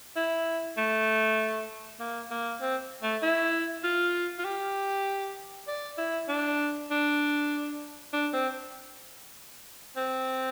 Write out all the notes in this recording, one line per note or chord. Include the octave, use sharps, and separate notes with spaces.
E4
A3
A#3
A#3
C4
A3
E4
F4
F4
G4
D5
E4
D4
D4
D4
C4
C4